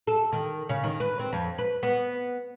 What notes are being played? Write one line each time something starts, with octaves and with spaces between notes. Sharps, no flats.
A4
D#3
C#3
D#3
B4
C4
F2
B4
B3